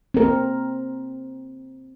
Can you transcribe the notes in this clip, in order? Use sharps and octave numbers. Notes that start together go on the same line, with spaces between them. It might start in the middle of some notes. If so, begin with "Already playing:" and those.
C4 A#4